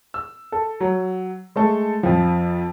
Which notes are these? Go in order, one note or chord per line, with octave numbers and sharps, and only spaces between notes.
E6
A4
F#3
G#3 A3 A4
F2 F3